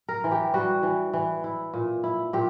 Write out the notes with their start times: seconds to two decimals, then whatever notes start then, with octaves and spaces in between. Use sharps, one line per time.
0.09 A#4
0.24 E3
0.32 G4
0.54 G3 F#4
0.83 E3
1.13 E3
1.44 E4
1.74 A#2
2.04 E4
2.33 A#2 G4